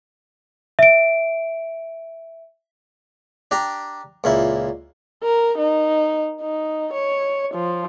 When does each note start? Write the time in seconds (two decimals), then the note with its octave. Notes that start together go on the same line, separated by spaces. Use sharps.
0.79 E5 D7
3.51 D4 G4 A#5
4.24 C#2 A#2 E4
5.24 A#4
5.58 D#4
6.41 D#4
6.94 C#5
7.55 F3